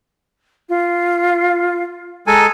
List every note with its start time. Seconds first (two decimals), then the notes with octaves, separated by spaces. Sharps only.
0.69 F4
2.27 G#3 A4 G#5 A#5